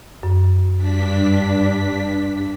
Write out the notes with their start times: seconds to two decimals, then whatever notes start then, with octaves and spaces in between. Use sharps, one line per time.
0.23 F#2
0.76 G2 D4 B6